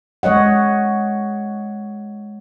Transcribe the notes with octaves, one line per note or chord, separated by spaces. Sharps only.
G#3 C#5 D#5 F#5